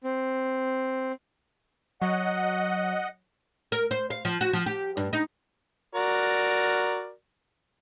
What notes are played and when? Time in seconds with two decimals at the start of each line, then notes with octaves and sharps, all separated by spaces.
0.04 C4
2.02 F#3 D#5 F#5
3.72 A#4
3.91 C5
4.10 F5
4.25 F3
4.41 F#4
4.53 F3
4.66 G4
4.97 G2
5.13 D#4
5.95 F#4 A#4 D5